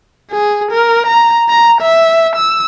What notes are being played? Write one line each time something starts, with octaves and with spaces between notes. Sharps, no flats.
G#4
A#4
A#5
A#5
E5
E6